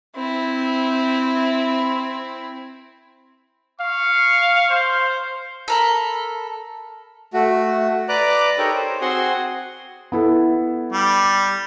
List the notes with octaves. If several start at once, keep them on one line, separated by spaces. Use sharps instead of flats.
C4 E4
F5 C#6
C5
A4 A#4 B5
A3 F#4
B4 D5 A#5 D6 F#6
D#4 G4 A4 A#4 C#5
C5
C4 F#4 G#4 F#5 G#5 C6
B3 E4 A4
G3